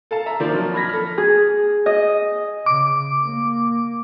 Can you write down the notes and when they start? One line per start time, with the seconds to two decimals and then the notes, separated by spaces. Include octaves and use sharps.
0.11 A4 F5 A5
0.26 E5 A#5
0.40 D#3 F3 A#3 C5 D5
0.54 F3 F#3
0.74 B5 F6 G#6 A#6 B6
0.89 A4 F6
1.18 G#4
1.86 D#5
2.66 C#3 D6
3.23 A#3